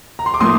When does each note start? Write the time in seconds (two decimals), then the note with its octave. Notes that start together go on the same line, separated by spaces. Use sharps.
0.19 A#5
0.26 C6
0.34 D6
0.40 A2 F3 A#3 C6 D#6